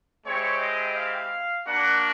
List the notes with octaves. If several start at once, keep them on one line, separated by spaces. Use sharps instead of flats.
G#3 C4 E4 G4 C#5
D#5
F5
A#3 D4 F#4 F#5